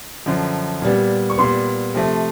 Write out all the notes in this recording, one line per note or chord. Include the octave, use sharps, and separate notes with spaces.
F#2 D3 F3
A#2 G3 B3
C#6
A#2 G3 B3 C6
C3 F3 A3